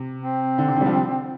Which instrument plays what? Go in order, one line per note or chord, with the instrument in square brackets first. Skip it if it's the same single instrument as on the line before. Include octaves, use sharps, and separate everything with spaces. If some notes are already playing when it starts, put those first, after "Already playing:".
Already playing: [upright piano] C3
[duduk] C4
[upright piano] D3
C3
D3
G3
F3